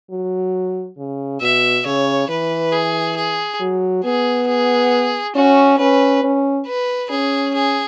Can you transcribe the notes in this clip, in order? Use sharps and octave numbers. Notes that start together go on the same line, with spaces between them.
F#3
C#3
B2 E5
C#3 C#5
E3 B4
G#4
G#4
F#3
B3 G#4
G#4
C#4 F#4
C#4 B4
C#4
B4
C#4 G#4
G#4